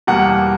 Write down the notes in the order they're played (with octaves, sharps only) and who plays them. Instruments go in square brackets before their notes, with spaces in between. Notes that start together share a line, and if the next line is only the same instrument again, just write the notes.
[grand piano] E2 B2 G3 A#3 F#5